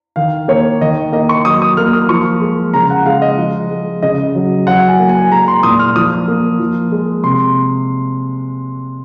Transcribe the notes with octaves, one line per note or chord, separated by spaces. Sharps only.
D#3 F5
A#3 C#5
D#3 D#5
A#3 D#5
C#6
F#3 D#6
D#6
A#3 F6
D#6
F3 C#6
G#3
C#3 A#5
F#5
G#3 F5
D#5
F3
G#3
C#3 D#5
F#3
F#3 F#5
G#5
A#3
G#5
G#3 A#5
C6
A#2 D#6
F6
F3 D#6
A#3
F3
G#3
C3 C6